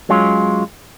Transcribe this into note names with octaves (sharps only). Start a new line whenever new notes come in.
F#3 G#3 C#4 F4